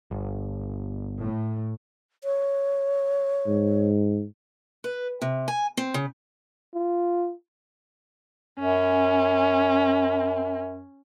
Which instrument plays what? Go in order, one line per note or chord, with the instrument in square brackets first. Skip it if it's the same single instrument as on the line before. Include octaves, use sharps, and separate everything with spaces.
[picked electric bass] G1
[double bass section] A2
[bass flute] C#5
[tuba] G#2
[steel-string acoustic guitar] B4
C3
G#5
C4
C#3
[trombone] F4
[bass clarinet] F#2 [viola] C#4